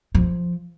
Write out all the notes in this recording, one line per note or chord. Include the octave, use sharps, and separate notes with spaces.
F3